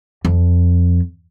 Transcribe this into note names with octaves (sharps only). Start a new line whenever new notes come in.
F2